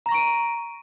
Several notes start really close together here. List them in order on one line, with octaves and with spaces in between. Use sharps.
A#5 A#6 C#6 D7 D#7